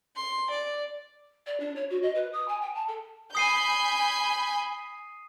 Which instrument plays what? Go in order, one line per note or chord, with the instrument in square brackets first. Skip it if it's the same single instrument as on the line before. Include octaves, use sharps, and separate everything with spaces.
[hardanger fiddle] C6
D5
[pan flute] D5
D4
C#5
F#4
D#5
B4
D#6
G#5
G5
A5
A4
[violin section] G#5 B5 G6 [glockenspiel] D#6 C7 D#7